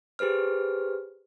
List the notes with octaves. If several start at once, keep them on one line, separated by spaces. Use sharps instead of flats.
G4 G#4 B4 C5 F6